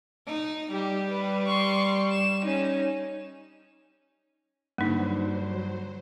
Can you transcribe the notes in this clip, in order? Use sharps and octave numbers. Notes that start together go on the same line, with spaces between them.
D#4
G3 G4
B4
C6 C#6
E7
C#4 D#4
G2 D3 F#3 A#3 D#4 C5